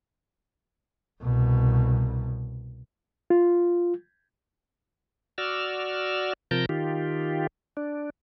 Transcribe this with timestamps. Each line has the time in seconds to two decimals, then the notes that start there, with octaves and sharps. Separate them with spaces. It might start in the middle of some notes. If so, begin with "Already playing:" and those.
1.22 C2 B2
3.30 F4
5.38 F#4 D5 E6 F6
6.51 C3 F3 A#4 A5 A#5 G6
6.69 D#3 F4 G4
7.77 D4